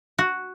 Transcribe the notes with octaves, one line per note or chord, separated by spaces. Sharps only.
F#4